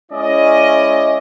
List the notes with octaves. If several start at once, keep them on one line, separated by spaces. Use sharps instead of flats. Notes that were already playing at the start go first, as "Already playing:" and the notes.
G#3 C#4 E4 D5 D#5